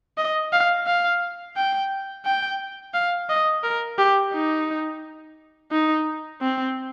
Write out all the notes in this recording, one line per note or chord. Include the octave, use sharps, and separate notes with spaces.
D#5
F5
F5
G5
G5
F5
D#5
A#4
G4
D#4
D#4
C4